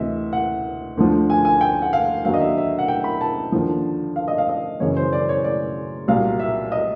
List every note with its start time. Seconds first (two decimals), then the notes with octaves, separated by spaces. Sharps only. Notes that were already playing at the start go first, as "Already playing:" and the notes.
Already playing: D2 C3 E3 D#5 E5
0.33 F#5
0.97 D2 D3 F3
1.30 G#5
1.45 G#5
1.61 G5
1.82 F#5
1.93 F5
2.25 D#2 D3 F#3 F5
2.34 D#5
2.40 E5
2.57 E5
2.79 F#5
2.88 G5
3.04 B5
3.21 A5
3.52 D#2 D3 F3
4.16 F5
4.28 D#5
4.38 F5
4.49 D#5
4.80 F#2 C#3 E3 C#5
4.97 C5
5.13 D5
5.29 C#5
5.44 D5
6.08 C2 A#2 F#3 F5
6.39 E5
6.72 D#5